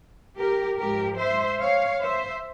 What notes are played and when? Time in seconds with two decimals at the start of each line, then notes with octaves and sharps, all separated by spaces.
0.38 G4 A#4
0.78 G#2 F3 G#3 G4 A#4
1.19 C5 E5
1.60 C#5 F5
2.01 C5 E5